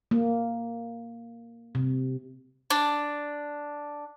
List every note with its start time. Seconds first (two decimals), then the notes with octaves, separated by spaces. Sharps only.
0.11 A#3
1.75 C3
2.70 D4